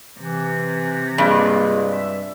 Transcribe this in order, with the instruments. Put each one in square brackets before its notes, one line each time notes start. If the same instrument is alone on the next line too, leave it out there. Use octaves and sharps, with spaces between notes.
[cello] C3 [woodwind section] E3
[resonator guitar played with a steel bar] G2 [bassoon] G#3 [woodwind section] A#3 F4
[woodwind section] E5